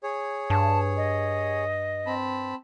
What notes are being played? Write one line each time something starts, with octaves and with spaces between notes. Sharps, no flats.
G#4 C#5
G2 A5
D#5
C4 A5 B5